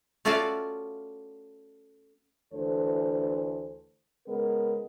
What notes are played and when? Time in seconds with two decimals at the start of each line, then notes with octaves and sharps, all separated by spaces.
0.25 A3 C#4 F4 F#4 D5 F5
2.54 D2 E3 A4 C5
4.27 C#3 G#3 B3 G#4 A#4